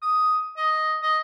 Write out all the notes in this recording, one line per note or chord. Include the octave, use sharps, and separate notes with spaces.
D#6
D#5
D#5